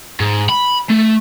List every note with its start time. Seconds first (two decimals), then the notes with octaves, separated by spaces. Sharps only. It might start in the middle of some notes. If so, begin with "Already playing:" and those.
0.20 G#2
0.49 B5
0.90 A3